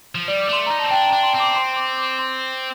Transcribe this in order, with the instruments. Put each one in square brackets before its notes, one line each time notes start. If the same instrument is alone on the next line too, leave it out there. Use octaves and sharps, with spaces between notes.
[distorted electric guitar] F3
[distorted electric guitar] G3 [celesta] D5
[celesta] D6
[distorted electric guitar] A3 [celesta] C6
[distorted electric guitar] D#4 [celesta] A#5
[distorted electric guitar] C4 [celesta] A5
[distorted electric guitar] D4 [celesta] G5
[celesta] A#5
[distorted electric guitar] D4
[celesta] C6
[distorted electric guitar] C4
[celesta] D6
C6
D6
D6
C6